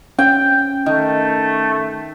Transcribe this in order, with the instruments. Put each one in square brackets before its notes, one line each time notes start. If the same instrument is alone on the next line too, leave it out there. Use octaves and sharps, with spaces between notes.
[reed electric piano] C#4 [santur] G5
[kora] D#3 [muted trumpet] A3